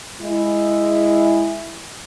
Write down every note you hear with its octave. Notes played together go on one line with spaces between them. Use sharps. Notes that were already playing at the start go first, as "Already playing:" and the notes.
G#3 E4